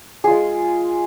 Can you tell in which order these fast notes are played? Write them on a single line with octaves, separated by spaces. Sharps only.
G#4 F4 G#3